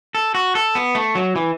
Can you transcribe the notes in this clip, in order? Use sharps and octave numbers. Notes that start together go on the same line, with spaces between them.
A4
F#4
A4
B3
A3
F#3
E3